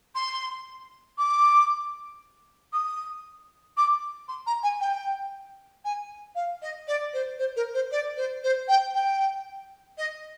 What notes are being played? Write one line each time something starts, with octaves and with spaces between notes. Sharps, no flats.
C6
D6
D#6
D6
C6
A#5
G#5
G5
G#5
F5
D#5
D5
C5
C5
A#4
C5
D5
C5
C5
G5
G5
D#5